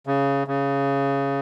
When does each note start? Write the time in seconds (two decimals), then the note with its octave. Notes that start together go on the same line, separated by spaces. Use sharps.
0.07 C#3
0.47 C#3